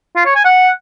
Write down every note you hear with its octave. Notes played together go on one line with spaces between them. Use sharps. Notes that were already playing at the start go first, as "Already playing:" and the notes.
F4
C#5
G#5
F#5